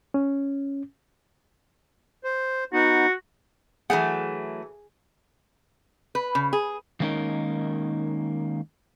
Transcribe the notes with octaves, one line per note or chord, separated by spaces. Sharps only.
C#4
C5
B3 D#4 F#4
E3 F#3 A3 G#4 F#5
B4
C#3
G#4
D#3 G#3 A#3 C#4 D#4 A#4